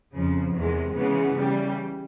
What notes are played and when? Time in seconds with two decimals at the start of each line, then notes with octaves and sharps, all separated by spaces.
0.14 F2 C#3 F3
0.55 E2 C3 D#3 G#3
0.96 C#3 E3 G#3 B3
1.37 C#3 E3 G3